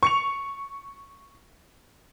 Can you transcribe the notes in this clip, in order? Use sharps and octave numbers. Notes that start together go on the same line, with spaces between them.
C#6 C#7 F7